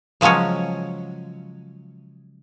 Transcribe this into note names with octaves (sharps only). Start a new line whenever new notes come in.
C#3 F3 F#3 G#3 C#4